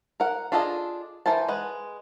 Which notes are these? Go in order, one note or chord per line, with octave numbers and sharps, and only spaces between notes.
A#4 F#5
D4 F4 G#4 A4 D#5
E3 A#4 C5 A5
G#3 B4 F#5